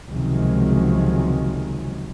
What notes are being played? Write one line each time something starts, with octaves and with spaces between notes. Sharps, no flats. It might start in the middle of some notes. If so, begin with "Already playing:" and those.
C#2 C3 D#3 F3 F#3 G#3